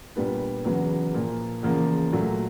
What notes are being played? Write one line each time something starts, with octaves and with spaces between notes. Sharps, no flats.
A#2 G3 B3 D4
E2 C#3 F#3 B3
A#2 F3 A#3
E2 C#3 F3 A#3
A#2 F#3 A3